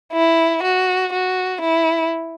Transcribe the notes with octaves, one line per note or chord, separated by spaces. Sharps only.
E4
F#4
F#4
E4